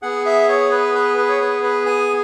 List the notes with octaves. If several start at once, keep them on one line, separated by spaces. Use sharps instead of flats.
B3 G#4 F#5
E5
C#5
B4
B4
B4
C#5
B4
B4
G#5